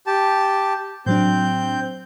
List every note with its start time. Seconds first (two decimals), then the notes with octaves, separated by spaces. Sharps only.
0.07 G4 A5
1.06 A2 F#3 C4 D4 G6